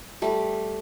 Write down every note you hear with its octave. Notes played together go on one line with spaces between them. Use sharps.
G3 A3